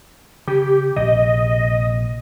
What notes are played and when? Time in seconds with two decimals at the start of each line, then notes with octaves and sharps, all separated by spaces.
0.47 C#3 G4
0.96 A#1 C3 D#5